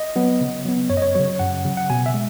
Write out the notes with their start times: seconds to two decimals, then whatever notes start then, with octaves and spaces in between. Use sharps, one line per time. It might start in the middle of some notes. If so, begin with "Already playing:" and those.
Already playing: D#5
0.16 F#3 B3
0.41 C#3
0.65 F#3 B3
0.90 F#2 C#5
0.97 D#5
1.02 C#5
1.15 C#3 F#3 C#5
1.39 F#2 F#5
1.65 C#3 F#3
1.77 F#5
1.90 B2 G#5
2.06 E5
2.14 G#3